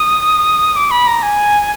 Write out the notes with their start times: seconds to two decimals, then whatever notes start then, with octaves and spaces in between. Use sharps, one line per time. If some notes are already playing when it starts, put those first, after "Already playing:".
Already playing: D#6
0.76 D6
0.91 B5
1.07 A#5
1.23 G#5